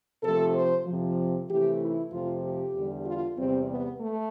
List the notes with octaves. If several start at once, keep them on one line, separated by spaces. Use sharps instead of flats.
C3 F3 A3 A4
C5
F2 C3 F3
C3 E3 A3 G4
E4
F2 C3 F3 A3 F4
G4
E2 D3 G3
F4
E2 C3 G3 C4
B3
A3